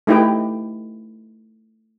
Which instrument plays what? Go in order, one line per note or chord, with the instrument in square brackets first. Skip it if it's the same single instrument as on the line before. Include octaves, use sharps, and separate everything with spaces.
[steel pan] A3 D#4 E4 G4 B4 G5